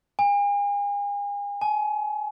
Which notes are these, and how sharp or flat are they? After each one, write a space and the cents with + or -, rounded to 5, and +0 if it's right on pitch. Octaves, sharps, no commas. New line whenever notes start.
G#5 -40
G#5 +35